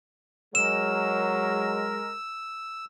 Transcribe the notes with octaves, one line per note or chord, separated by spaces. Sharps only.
F#3 G#3 A#4 E6 E7